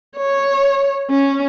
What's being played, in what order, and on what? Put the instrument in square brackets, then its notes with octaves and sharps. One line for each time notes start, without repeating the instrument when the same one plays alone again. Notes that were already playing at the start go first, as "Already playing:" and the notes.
[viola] C#5
C#4